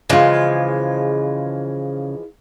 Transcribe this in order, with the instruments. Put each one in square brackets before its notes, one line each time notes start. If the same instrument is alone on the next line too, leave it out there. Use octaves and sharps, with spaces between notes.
[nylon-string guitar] C#3 F4 [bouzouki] E3 F3 G#3